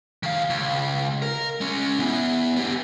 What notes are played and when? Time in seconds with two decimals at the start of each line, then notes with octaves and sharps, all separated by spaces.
0.23 D#3 F5
0.50 C#2
1.22 A#4
1.61 G#3 C#4
1.99 B3 E4
2.56 B3 G4